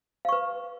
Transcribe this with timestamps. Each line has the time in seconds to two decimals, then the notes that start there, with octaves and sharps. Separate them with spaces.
0.25 F5
0.29 C#6
0.32 B4